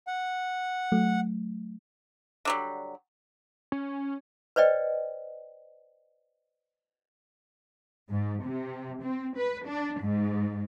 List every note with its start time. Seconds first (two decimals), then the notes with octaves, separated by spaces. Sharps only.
0.07 F#5
0.92 F#3 A3
2.45 D3 F#3 G3
3.72 C#4
4.56 B4 C5 D5 D#5 G5
8.08 G#2
8.44 C3
9.02 C4
9.37 B4
9.66 D4
10.00 G#2